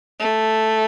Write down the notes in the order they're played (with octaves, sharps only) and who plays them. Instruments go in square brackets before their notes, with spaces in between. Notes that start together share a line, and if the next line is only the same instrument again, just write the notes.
[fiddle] A3